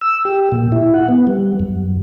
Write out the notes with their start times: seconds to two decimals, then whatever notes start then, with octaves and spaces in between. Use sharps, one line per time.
0.01 E6
0.25 G4
0.52 A#2
0.72 E4
0.94 F#5
1.08 B3
1.27 G3
1.60 F#2